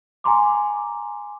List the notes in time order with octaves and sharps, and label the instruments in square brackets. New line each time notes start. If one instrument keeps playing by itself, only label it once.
[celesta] G#5 A#5 C6 D6